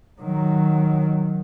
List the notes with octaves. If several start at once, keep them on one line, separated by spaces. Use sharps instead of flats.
D#3 F#3